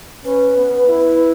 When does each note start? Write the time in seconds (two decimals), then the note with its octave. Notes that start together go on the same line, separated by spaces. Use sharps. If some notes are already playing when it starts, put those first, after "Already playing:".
0.25 C#4 B4
0.56 B3
0.88 E4